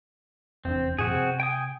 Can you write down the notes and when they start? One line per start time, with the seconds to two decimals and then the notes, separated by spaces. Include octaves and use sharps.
0.65 F1 E2 C4 D4
0.99 F#2 A#2 F3 C4 F#4 G#4
1.13 C3
1.40 G5 G#5 D#6